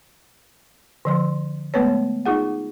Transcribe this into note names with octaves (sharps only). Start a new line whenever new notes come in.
D3 F3 C6
G#3 A3 B3 B4 C#5
D#4 F4 G#4 F#5